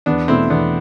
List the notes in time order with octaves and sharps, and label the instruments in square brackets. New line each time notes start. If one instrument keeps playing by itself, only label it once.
[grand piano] E2 [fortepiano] B3 D4
[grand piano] B2 A3 [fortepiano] C4 E4
[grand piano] E2 [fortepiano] B3 D4